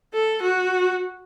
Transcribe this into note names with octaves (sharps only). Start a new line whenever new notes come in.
A4
F#4